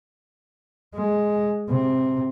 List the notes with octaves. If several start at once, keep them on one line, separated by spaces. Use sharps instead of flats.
G#3
C3